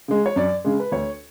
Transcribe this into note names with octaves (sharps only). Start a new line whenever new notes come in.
C#3 G#3
C#5
F#2 D5
C#3 G#3
B4
D2 C#5